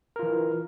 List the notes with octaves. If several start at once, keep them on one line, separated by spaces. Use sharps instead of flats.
E3 F4 A#4